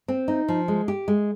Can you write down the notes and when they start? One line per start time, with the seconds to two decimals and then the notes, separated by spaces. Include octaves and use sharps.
0.08 C4
0.28 D#4
0.48 F3
0.68 G#3
0.88 G4
1.08 G#3